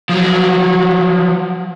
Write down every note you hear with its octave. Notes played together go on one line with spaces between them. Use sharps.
F3 F#3